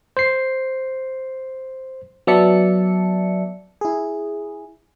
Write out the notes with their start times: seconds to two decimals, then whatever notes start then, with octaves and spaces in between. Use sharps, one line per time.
0.17 C5 C7
2.27 F#3 B3 D5 E5 A5 C#7
3.81 E4 G#4